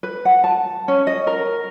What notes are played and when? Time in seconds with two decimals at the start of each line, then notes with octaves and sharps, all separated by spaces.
0.03 B4
0.25 F#5
0.44 A5
0.88 C#4
1.07 D#5
1.27 A#4